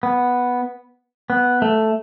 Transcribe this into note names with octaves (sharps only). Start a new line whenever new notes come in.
B3
B3
A3